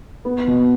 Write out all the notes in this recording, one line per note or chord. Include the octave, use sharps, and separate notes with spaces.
B3
B2